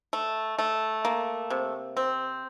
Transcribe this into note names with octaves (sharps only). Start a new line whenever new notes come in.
A3
A3
A#3
C3
C4